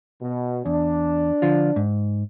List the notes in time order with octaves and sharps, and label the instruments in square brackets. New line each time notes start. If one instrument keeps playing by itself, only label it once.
[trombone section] B2
[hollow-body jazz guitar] E2 [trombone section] D4
[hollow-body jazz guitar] D3 F3 F4
G#2